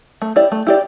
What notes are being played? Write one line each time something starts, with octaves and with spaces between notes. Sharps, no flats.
A3
E4 G4 D5
A3
E4 G4 D5